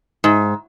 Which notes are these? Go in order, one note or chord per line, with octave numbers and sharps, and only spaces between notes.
G#2